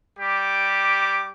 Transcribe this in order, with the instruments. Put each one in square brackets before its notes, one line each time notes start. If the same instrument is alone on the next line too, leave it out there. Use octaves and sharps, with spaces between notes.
[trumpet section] G3 G4 D6